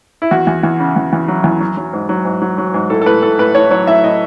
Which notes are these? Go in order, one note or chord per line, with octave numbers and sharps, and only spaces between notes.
E4
E2 F#4
E2
E2
C#3
E2
E2
F#3
E2
F#3
F#3
G#2
F#3
G#2
F#3
F#3
G#2
A2 A4
A4
A2 B4
A2 A4
A2 B4
A2 C#5
F#3 C#5
A2 E5
A2 D#5